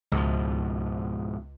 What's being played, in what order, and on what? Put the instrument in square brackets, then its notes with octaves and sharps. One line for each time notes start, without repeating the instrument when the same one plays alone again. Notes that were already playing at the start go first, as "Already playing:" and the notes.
[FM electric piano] C#2 [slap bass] G#2 B2 F3